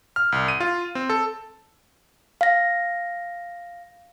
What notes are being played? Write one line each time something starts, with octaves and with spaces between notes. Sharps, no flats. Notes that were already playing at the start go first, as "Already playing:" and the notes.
F6
C2
D#7
F4
C4
A4
F5 A#6